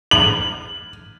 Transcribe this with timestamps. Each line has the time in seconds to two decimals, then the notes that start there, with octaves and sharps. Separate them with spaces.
0.11 F#7